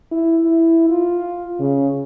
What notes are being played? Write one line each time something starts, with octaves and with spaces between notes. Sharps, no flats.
E4
E4
F4
C#3